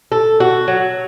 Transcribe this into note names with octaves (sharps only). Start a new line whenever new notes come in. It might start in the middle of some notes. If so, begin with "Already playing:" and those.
A4
F#4
F#3